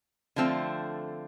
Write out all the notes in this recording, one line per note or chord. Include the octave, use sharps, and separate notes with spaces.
D3 F3 A3 C4